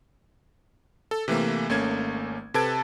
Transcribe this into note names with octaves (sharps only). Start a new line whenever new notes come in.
A4
C3 E3 A3 A#3
G#1 A3 A#3 C#4 G#6
C3 A4 B4 A5 G#6 D7